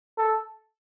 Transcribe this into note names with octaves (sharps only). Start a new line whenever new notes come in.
A4